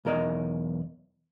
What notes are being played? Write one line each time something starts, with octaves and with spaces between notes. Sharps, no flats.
B1 E2 A#4 D5 D#5